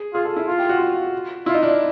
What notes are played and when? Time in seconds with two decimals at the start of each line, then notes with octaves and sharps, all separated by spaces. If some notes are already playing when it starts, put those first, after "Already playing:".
Already playing: G#4
0.14 F4 G#4
0.25 A4
0.36 E4
0.47 F4
0.59 G4
0.69 F#4
0.80 F4
1.46 E4 F4
1.54 D#4
1.63 D4